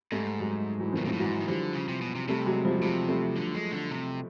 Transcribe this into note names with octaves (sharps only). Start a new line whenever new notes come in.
G#2 G3 A3
F#3 G#3
E3 F#3
B2 D#3 F3
A#2 D#3 F3
A2
G#2 E3 F#3
D#3
D3 F3 G3
C#3
C3
B2
C3
C3 G3 A3
F#3 G#3
F3 G3
F#3
C3 F3 G3
G3 A3
D3
G#3
D3
C3